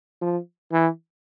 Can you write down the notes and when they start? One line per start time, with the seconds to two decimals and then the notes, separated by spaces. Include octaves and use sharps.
0.21 F3
0.72 E3